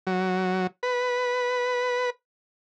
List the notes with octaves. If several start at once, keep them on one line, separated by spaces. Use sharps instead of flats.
F#3
B4